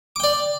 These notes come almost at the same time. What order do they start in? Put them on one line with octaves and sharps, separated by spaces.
D6 G5 D5